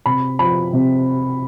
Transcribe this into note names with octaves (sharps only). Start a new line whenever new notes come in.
C3 B5
F3 B5
C3